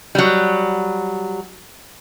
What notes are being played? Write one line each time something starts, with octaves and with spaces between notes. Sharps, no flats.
F#3 G3